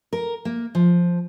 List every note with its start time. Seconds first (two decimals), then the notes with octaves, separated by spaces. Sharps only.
0.13 A#4
0.45 A#3
0.75 F3